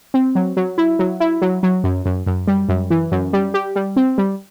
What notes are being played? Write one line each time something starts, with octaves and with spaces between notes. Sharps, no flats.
C4
F#3
F#3
E4
F#3
E4
F#3
F#3
F#2
F#2
F#2
G3
F#2
E3
F#2
G3
G4
G3
C4
G3